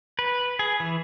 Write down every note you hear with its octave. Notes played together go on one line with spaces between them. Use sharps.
B4
G#4
E3